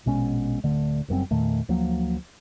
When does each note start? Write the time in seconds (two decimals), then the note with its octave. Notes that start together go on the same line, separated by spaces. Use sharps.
0.06 A#1 B2 G#3 C#4
0.63 D1 D3 A3
1.08 F#1 F#2 G3 C4
1.31 E2 A#2 D#3 A3
1.69 D2 F3 F#3 A#3